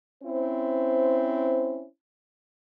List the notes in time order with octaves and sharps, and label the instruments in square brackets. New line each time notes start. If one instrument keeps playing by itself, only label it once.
[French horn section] C4 C#4 E4 C5